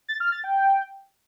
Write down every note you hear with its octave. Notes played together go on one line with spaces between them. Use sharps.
A6
F6
A6
G5